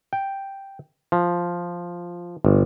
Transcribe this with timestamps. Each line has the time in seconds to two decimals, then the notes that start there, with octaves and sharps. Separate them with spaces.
0.13 G5
1.12 F3
2.45 G1